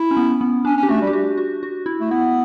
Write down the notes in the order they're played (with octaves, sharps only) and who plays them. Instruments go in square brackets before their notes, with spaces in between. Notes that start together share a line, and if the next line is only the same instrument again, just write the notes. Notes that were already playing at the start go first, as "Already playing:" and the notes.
Already playing: [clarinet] E4
[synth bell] C#4
B3
B3
[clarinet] C#4 [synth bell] D4
[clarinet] C#4
[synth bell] G4
[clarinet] A3 [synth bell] F#4
[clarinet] G3
[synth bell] G4
F#4
F#4
F#4
E4
[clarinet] A3
[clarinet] B3 [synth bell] E4